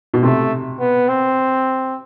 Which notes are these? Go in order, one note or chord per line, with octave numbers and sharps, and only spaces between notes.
B2
C3 A3
B3
C4